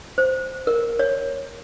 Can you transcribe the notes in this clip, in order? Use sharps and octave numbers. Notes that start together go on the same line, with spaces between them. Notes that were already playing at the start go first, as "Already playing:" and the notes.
C5
A#4
C#5